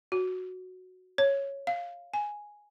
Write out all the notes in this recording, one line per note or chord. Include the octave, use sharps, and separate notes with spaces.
F#4
C#5
F5
G#5